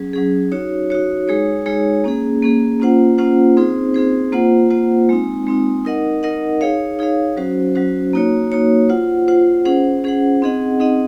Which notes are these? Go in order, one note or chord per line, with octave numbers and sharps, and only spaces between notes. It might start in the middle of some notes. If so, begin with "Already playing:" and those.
Already playing: F#3 C#4 G#4
F#3 C#4 G#4
D#4 F#4 C#5
D#4 F#4 C#5
G#3 D#4 G#4 C#5
G#3 D#4 G#4 C#5
A#3 C#4 G#4
A#3 C#4 G#4
A#3 C#4 F4 C5 F#5
A#3 C#4 F4 C5 F#5
C4 D#4 G#4 C5
C4 D#4 G#4 C5
A#3 F4 C5 F#5
A#3 F4 C5 F#5
G#3 C4 D#4
G#3 C4 D#4
D#4 A#4 D#5 F#5
D#4 A#4 D#5 F#5
D#4 G#4 C#5 F5
D#4 G#4 C#5 F5
F#3 C#4 F#4 C5
F#3 C#4 F#4 C5
A#3 D#4 F#4 C#5
A#3 D#4 F#4 C#5
F4 C5 F#5
F4 C5 F#5
C#4 G#4 C5 F#5
C#4 G#4 C5 F#5
C4 D#4 G#4 D#5 F#5
C4 D#4 G#4 D#5 F#5